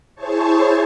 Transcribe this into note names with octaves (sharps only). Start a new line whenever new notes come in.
E4 G#4 C5 C#5 A5 C#6